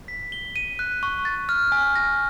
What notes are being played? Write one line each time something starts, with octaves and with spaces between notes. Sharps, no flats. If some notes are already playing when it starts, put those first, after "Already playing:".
B6
G7
D#7
F#6
C#6
A6
F6
G#5
A#6